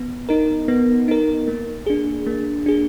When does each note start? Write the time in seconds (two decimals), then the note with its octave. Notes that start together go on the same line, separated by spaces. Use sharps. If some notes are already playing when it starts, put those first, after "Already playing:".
Already playing: B3
0.29 D#4 A#4
0.68 B3
1.08 D#4 A#4
1.48 A#3
1.86 D4 G#4
2.27 A#3
2.66 D4 G#4